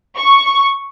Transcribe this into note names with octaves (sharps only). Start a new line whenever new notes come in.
C#6